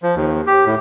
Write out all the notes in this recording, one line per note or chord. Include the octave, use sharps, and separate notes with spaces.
F3
D#2
G4
A2